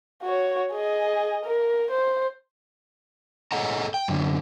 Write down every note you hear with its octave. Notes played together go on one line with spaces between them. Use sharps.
F#4 C#5
G#4 D#5
A#4
C5
G#4 A4 D#5 F#5 A#5
G5
F#2 D3